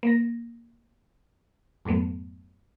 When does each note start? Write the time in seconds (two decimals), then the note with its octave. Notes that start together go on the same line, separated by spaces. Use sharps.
0.03 A#3 A#6
1.85 F2 G#2 F#3 A3 B3